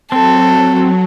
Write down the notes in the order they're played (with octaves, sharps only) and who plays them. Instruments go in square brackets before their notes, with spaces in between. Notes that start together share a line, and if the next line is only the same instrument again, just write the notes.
[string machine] F#3 [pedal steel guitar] C4 [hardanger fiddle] A4